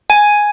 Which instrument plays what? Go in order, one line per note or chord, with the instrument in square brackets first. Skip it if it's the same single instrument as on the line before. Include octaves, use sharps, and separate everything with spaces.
[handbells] G#5